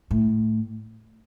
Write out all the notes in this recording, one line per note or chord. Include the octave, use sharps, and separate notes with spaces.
A2